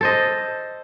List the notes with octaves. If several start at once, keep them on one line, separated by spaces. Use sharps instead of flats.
A4 C5 D#5